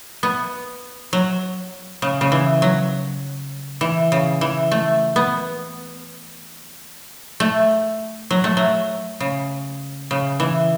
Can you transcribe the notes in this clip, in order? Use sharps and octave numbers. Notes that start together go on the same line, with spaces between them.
B3
F#3
C#3
C#3
E3
F#3
E3
C#3
E3
A3
B3
A3
F#3
A3
F#3
C#3
C#3
E3